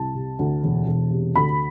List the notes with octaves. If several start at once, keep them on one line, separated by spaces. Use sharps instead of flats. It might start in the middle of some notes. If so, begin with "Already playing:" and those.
Already playing: C2 A5
C3
D2
E1
E1
C3
D2 B5